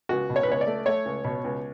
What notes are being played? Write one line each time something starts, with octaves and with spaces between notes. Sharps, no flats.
C#2 F#4
B2
C#5
B4
C#2 C#5
D5
A3
A3 C#5
C#2
B2
C#2